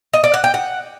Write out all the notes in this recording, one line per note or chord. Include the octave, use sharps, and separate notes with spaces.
D#5
D5
F#5
G5
F#5